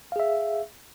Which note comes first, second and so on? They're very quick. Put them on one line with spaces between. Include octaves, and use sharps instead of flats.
F5 G#4 E5